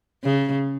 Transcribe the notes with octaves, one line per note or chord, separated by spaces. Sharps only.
C#3